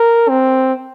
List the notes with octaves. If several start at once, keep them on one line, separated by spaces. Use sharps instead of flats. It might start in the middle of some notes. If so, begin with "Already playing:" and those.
Already playing: A#4
C4